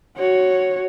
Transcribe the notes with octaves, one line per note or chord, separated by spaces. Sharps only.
F#4 C#5